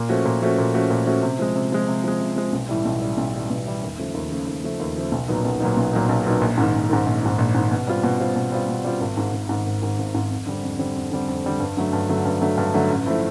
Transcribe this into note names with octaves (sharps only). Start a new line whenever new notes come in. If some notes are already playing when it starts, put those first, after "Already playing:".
Already playing: A#2
F3 A3 C#4 F#4
A#2
F3 A3 C#4 F#4
A#2
F3 A3 C#4 F#4
A#2
F3 A3 C#4 F#4
C3
F3 G#3
C3
F3 G#3
C3
F3 G#3
C3
F3 G#3
B1
A2 E3 G3
B1
A2 E3 G3
B1
A2 E3 G3
B1
A2 E3 G3
D#2
C#3 F3 A3
D#2
C#3 F3 A3
D#2
C#3 F3 A3
D#2
C#3 F3 A3
B1
A#2 F#3 B3 D#4
B1
A#2 F#3 B3 D#4
B1
A#2 F#3 B3 D#4
B1
A#2 F#3 B3 D#4
A#1
G#2 D#3
A#1
G#2 D#3
A#1
G#2 D#3
A#1
G#2 D#3
B2
G3 C4 F4
B2
G3 C4 F4
B2
G3 C4 F4
B2
G3 C4 F4
G#1
G#2 D#3
G#1
G#2 D#3
G#1
G#2 D#3
G#1
G#2 D#3
F2
D3 G3 C4
F2
D3 G3 C4
F2
D3 G3 C4
F2
D3 G3 C4
G2
D3 F#3 A3
G2
D3 F#3 A3
G2
D3 F#3 A3
G2
D3 F#3 A3
A1
A2 F3 A3